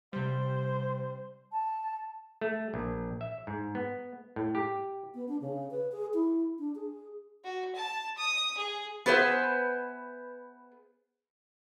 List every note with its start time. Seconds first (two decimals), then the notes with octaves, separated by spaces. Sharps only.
0.13 C3 G3 C5
1.52 A5
2.41 A3
2.74 A#1
3.21 E5
3.47 G#2
3.75 B3
4.36 A2
4.55 G4
5.14 B3
5.28 D4
5.41 C#3
5.71 B4
5.92 G#4
6.14 E4
6.59 D4
6.75 G#4
7.45 F#4
7.75 A5
8.18 D#6
8.58 G#4
9.06 B3 G#4 B4 C5 E5